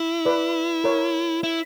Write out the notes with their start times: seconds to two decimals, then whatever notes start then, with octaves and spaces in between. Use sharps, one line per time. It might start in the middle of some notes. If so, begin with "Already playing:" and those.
Already playing: E4
0.25 B4 D5
0.84 A#4 C#5
1.43 E4